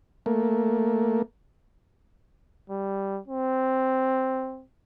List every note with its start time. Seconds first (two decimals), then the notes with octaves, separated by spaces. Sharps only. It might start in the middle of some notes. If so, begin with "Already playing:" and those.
0.26 A3 A#3
2.70 G3
3.28 C4